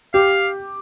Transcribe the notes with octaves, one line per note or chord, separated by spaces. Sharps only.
G4 F5